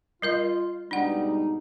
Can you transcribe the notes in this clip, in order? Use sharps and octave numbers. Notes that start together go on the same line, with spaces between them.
G3 F4 A#4 D#5
G#2 B2 G3 D4 D#4 F#5